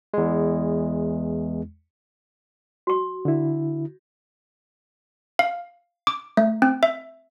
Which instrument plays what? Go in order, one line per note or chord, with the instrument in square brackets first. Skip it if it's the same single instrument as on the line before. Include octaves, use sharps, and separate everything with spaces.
[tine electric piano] E2 G#3
[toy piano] F#4 C#6
[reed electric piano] D3 E4
[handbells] F5
D6
A3
C4
E5